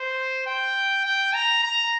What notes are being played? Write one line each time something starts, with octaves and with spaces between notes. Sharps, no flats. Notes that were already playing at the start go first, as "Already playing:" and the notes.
Already playing: C5
G5
G5
A#5
A#5